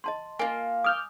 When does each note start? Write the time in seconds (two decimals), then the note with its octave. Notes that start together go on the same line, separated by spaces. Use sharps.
0.04 D#5 A5 C6
0.39 A#3 D4 F4 G#5
0.84 D6 D#6 F6 G6